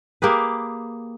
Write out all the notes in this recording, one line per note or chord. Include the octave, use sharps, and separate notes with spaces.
A#3 G4 G#4 B4